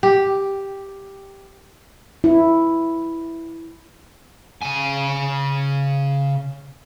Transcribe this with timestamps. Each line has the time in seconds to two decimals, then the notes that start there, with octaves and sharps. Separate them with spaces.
0.03 G4
2.24 E4
4.63 C#3 G#5